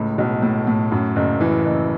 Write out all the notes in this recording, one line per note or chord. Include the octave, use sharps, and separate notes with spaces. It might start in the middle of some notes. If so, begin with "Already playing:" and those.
Already playing: C#2 A2
B1
A2
A2
F#2
F#1
E3
F#1